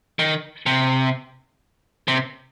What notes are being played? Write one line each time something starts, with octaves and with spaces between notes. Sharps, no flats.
D#3
C3
C3